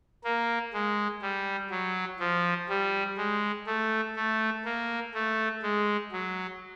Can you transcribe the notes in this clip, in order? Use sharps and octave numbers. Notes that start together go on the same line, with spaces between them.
A#3
G#3
G3
F#3
F3
G3
G#3
A3
A3
A#3
A3
G#3
F#3